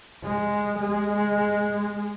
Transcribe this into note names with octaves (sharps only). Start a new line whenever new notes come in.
G#3
G#3